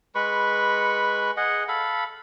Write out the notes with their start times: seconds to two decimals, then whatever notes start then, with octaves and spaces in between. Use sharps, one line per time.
0.15 G#3 B4 B5 C#6
1.37 G#4 D#5 F#5
1.68 A4 F5 B5